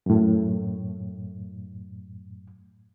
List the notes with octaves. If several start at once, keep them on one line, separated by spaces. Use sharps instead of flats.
F#2 A2